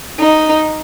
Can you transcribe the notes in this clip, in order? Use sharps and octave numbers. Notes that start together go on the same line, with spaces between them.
D#4